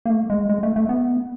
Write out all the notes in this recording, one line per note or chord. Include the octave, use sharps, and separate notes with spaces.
A#3
A3
G#3
G#3
A3
A3
B3